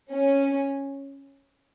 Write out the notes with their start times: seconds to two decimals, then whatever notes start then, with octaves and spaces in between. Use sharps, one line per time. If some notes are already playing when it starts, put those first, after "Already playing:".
0.11 C#4